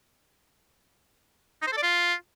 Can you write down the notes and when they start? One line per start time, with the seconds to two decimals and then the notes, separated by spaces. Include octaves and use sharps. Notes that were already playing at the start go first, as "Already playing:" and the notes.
1.62 D#4
1.67 C5
1.72 A4
1.77 D5
1.83 F4